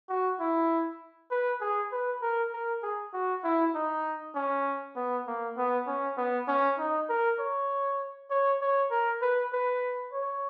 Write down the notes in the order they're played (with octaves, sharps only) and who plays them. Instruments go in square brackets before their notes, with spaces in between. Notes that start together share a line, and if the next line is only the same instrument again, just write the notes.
[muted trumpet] F#4
E4
B4
G#4
B4
A#4
A#4
G#4
F#4
E4
D#4
C#4
B3
A#3
B3
C#4
B3
C#4
D#4
A#4
C#5
C#5
C#5
A#4
B4
B4
C#5